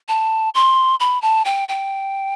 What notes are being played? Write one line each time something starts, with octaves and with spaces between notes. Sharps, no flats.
A5
C6
B5
A5
G5
G5